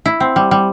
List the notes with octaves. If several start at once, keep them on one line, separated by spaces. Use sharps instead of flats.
E4
C4
G3
G3